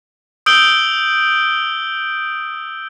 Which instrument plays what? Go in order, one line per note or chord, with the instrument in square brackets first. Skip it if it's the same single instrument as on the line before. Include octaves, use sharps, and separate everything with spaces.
[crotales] D#6 E6 G6 D7 F#7 G7